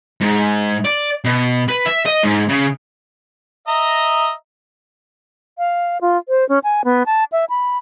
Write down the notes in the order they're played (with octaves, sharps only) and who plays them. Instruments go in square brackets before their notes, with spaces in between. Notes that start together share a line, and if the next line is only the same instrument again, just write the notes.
[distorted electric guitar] G#2
D5
B2
B4
E5
D#5
G#2
C#3
[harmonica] D#5 E5 A#5
[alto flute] F5
F4
C5
C#4
G#5
B3
A5
E5
B5